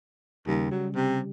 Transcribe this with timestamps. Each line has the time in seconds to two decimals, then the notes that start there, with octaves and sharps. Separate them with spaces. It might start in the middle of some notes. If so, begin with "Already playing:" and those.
0.47 D#2 C#3 G3 G4
0.71 F#3
0.95 C3